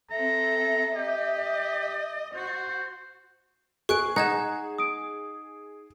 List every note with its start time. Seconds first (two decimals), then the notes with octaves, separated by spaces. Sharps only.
0.11 C4 A4 E5 A#5
0.96 G4 D#5
2.34 F#4 C5
3.89 G#4 C#6 F#6 D7
4.16 D#4 F#5 F#6 G#6 E7
4.78 D#6 D7